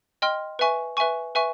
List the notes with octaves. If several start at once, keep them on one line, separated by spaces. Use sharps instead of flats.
D#5 G5 C6 F6
B4 E5 G#5 C#6
B4 E5 G#5 C#6
B4 E5 G#5 C#6